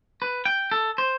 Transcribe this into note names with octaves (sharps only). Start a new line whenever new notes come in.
B4
G5
A4
C5